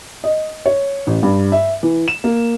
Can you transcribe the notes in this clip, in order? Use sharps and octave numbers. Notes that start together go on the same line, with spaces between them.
D#5
C#5
A1
G2
E5
E3
E7
A#3